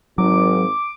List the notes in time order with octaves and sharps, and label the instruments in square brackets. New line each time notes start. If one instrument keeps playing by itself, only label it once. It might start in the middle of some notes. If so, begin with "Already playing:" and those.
[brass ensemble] G#1 [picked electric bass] F#3 [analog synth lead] D6